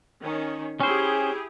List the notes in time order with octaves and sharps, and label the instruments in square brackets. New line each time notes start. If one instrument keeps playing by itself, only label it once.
[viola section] D#3 C#4
[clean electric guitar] C#4 C5 [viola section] E4 G4 G#4